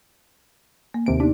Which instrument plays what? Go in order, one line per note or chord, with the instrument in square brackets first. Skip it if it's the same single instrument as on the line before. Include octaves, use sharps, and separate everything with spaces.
[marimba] A#3
[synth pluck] D#2 C3 D7 [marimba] A#3
[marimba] B3 D#4 G4 [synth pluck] D4